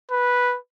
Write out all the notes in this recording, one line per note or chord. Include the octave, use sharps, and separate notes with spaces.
B4